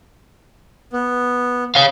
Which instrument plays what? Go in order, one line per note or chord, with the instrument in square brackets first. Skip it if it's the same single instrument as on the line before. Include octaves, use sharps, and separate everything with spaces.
[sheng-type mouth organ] B3
[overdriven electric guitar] C#5 F5